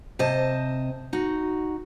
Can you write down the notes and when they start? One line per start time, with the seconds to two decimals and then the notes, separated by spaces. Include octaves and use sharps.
0.19 C3 C5 D#5 A5
1.13 D#4 F#4